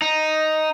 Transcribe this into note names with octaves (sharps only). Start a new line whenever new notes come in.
D#4